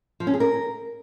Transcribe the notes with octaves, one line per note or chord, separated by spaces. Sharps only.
F3
C#4
G#4
A#4